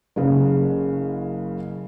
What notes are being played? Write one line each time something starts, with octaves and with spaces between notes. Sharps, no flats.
F#1 C#3